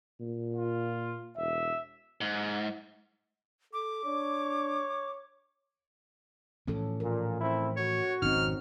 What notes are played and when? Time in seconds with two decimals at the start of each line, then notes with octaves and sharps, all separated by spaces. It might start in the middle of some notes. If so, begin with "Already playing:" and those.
0.21 A#2
0.55 F4
1.37 E1 E5
2.21 G#2
3.73 A4 D6
4.05 D4 C#5
6.68 A2 E3 F3 C#4 A4
7.00 A#2 A#4
7.39 A3 C4 E4
7.77 F#4 C#5
8.22 G#1 F2 B2 C4 C#4 D#4 F6